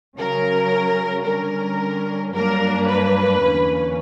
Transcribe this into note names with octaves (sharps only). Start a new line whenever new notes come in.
C#3 F#3 C#4 A#4
D3 G3 C#4 A#4
G2 F#3 A#3 D4 A#4
B4
E2 D3 A#3 C#4